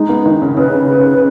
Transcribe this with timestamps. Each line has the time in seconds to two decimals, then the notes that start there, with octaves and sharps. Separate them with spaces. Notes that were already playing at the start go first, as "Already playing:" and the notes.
Already playing: G#3 D#4
0.09 B3
0.26 D#3
0.42 C#3
0.57 C#3 B4